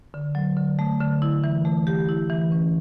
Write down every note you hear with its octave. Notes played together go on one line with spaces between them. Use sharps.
D3
F#3
D3
A3
D3
E4
E3
A3
G4
E4
E3
C#4